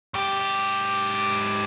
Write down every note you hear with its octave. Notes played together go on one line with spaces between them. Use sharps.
G#2 G4